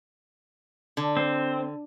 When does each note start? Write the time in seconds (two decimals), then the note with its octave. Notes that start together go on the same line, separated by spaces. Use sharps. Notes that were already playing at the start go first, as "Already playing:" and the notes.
0.97 D3
1.17 C4